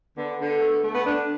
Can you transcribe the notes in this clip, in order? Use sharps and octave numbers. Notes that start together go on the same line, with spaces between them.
D3 B3
D3
A3
A3
B3
D3 D4